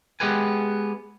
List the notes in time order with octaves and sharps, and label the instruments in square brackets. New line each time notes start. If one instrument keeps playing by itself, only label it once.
[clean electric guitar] G#3 B3 G4 B4 G#5